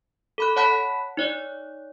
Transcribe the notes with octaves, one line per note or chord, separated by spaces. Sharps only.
A4 B5 F#6
C#5 F#5 A5 B5 F#6 B6
D#4 C#5 D5